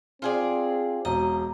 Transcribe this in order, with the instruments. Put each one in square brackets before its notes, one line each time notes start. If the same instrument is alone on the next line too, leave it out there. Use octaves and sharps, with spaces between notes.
[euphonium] C4 [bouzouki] F4 G#4 D5
[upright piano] E1 [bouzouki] D#5 [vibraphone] A#5